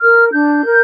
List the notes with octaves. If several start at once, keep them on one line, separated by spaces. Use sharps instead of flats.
A#4 F6
D4 G6
A#4